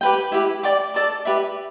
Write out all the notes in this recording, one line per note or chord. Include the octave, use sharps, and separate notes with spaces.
G4 B4 G5
E4 G4 B4
D5 G5 D6
A4 D5 A5 D6
G4 B4 E5